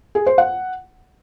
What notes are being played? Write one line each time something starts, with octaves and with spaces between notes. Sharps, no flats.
G#4
C5
F#5